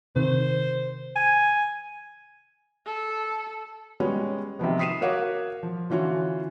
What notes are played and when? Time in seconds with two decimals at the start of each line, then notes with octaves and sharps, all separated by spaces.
0.16 C3 D#3 C5
1.16 G#5
2.86 A4
4.00 G3 G#3 B3 C#4
4.59 C3 D#3 F3 B3
4.79 D#6 B6 C7 D#7 E7
5.01 F#4 A#4 C#5 F5 F#5 D6
5.63 F3
5.90 D3 E3 C#4 F4 F#4